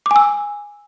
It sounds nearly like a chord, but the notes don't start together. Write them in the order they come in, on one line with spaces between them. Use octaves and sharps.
D6 G#5 E6